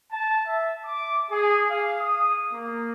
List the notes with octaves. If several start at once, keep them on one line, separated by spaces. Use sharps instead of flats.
A5
E5
D6
G#4
F5
D#6
A#3